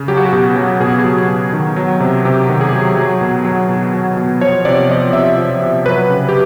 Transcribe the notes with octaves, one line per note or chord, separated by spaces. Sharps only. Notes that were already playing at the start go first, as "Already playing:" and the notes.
Already playing: C#3
F#3 G4
F#4
G4
B2
F#3
B2 G#4
F#3
B2
D#3
F#3
C3
C3 G4
D#3
G#4
F#3
F#3
B2
F#3
B2
F#3
B2
F3 C#5
C3 D5
F3 D#5
C3 E5
F3
C3
F#3 B4
C#3
G4